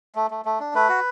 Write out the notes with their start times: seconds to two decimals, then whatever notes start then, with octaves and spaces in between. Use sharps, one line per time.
0.15 A3
0.31 A3
0.45 A3
0.60 D4
0.74 A3 B4
0.89 F#4